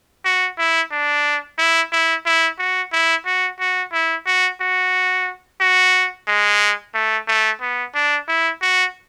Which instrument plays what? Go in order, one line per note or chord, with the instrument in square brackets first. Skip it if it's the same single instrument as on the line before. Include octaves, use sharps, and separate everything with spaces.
[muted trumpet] F#4
E4
D4
E4
E4
E4
F#4
E4
F#4
F#4
E4
F#4
F#4
F#4
G#3
A3
A3
B3
D4
E4
F#4